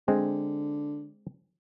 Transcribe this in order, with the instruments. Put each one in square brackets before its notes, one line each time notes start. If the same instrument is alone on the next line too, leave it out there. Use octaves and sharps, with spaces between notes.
[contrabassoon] D3 [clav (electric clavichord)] G#3 C4